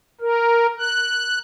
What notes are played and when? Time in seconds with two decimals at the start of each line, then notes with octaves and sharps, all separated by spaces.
0.21 A#4
0.79 F#6